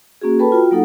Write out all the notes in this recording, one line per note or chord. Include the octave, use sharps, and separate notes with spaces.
A#3 C#4 F#4 G#4
A4 B4 G5 A5 B5
F4 F#4 G5
F#3 A#3 D#4 A4 F#5